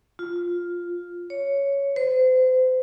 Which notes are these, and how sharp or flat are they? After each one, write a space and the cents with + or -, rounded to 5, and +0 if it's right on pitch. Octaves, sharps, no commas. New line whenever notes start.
F4 +5
C#5 +5
C5 -35